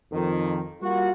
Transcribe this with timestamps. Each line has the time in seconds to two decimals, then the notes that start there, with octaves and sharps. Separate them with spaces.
0.12 F2 D#3
0.82 G3 A#3 F4 F#4